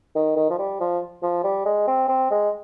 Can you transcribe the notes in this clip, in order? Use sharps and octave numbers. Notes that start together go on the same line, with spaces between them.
D#3
D#3
F3
G3
F3
F3
G3
G#3
C4
C4
G#3